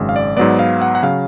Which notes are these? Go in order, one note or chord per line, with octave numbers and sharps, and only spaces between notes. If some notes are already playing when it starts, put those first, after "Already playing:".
Already playing: G#1 F#2 C#3 G#3
F5
D5
G#2 F#3 B3 D5
F5
F#5
F#5
C#3 F#3 F5